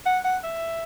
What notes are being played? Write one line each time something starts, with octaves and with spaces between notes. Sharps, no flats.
F#5
F#5
E5